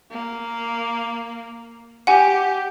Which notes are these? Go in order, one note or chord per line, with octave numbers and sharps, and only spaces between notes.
A#3
G4 F#5 G#5